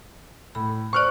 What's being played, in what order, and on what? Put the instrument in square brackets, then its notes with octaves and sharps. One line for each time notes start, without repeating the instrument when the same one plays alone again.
[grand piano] A2 [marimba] B5
[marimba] C5 D5 [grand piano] C#6 F6 F#6